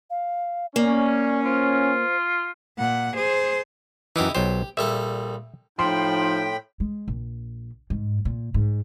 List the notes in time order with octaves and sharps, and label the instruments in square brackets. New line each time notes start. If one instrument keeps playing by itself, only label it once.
[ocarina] F5
[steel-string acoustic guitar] A#3 [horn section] C#4 [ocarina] D5
[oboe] F4 [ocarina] C5
[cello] A#2 F#5
G#4 C5
[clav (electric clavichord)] F#2 E3 [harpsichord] D#4 E4 G4
[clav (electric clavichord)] B1 F#3 C5 [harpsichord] G4
[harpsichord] A#1 G3 A4 [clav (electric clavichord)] E5
[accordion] A2 G5 B5 [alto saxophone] F3 [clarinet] D#4 [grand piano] C6
[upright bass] G#3
A#1
G#2
A#2
G#2